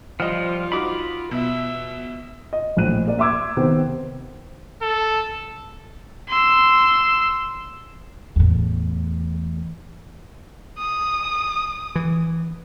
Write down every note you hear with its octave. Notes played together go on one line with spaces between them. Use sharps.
F3 G3 F4 D#5 F6
D#4 F#4 B5 D6
B2 E5
D#5
A#1 A2 C5 F#6 D#7
A#3 D5
E5 C6 D6 E6 G#6
C3 D#3 B3 C5
A4
C6 E6
E2 A2
D#6
E3